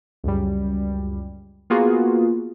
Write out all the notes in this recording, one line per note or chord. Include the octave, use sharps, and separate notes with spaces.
C#2 F#2 G3
A#3 B3 F4 F#4 G#4